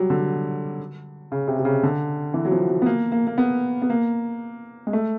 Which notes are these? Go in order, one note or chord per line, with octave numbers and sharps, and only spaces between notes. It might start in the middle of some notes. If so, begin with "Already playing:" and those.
Already playing: F#3 G3
D3
C#3
C3
C3
C#3
D3
E3
F#3
F3
F#3
B3
A#3
A#3
A#3
B3
B3
A#3
G#3
A3